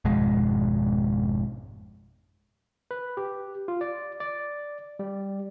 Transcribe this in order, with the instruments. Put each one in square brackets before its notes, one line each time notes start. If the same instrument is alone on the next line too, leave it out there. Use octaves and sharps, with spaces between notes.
[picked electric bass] G#1 F2 B2 G#3
[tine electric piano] B4
G4
F4
D5
D5
G3